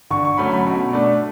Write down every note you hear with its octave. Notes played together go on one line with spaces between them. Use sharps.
D3 C#6
C#6
F#3 A3 C#4 B5
B5
B2
A3 D4